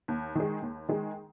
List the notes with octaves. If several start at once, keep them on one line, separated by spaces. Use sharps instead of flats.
D#2
D#3 G#3
D#2
D#3 G#3